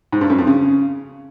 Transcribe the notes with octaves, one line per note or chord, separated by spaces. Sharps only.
G#2
G2
F#2
F2
C#3